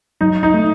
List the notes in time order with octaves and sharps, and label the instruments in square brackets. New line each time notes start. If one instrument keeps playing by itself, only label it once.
[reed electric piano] F#3 [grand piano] D#4
[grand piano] D#4
[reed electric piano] A3